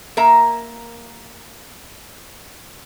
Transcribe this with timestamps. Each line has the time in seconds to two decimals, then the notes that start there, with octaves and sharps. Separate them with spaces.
0.17 A#3 A#4 E5 A#5